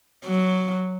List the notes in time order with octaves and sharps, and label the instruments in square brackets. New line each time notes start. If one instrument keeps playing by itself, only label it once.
[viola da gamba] F#3